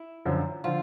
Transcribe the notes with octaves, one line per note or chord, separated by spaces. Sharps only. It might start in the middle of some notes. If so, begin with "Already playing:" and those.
Already playing: E4
F#2 D3 F3
D3 F3 F4